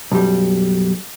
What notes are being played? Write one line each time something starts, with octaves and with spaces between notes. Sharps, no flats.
B1 F#2 G3